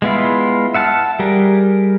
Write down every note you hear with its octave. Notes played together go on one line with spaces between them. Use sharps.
G#3 B3 E4 F4
E5 F#5 A5 F6
G3 G4 G#4 A#4